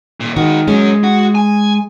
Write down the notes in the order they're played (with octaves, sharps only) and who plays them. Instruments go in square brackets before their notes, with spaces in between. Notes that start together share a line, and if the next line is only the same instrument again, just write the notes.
[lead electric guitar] D#2 A#2
[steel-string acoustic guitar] D#3 [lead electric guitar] G#3 F#4
[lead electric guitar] F#3 C#4 [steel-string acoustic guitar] G#3
[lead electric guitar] F#4 F#5
G#5